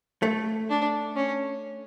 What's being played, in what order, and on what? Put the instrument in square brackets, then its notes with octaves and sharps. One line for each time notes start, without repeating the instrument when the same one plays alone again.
[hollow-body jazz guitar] A3
[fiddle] D4
C#4